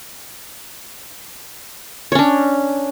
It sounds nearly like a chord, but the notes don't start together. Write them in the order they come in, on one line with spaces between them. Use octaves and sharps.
C#5 C#4 D4